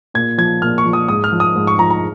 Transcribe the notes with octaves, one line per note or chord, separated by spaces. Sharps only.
A#2 G#6
F3 G#6
A#2 F6
C#6
F3
D#6
G#2 D#6
F6
F3
D#6
G#2
C#6
F3 A#5
A#5